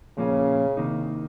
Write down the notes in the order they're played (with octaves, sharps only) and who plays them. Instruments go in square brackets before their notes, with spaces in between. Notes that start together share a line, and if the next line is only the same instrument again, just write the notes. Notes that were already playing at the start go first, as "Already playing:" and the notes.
[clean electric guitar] A#2 F3 A#3 C#4 [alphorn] C#3
[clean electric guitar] C2 C3 D#3 A#3 D#4